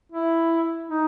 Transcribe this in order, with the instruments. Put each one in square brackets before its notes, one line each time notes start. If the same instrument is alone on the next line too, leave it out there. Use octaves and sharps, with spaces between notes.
[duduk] E4
D#4